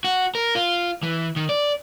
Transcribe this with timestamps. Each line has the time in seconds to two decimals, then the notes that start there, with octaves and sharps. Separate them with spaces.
0.04 F#4
0.35 A#4
0.55 F4
1.03 E3
1.36 D#3
1.49 D5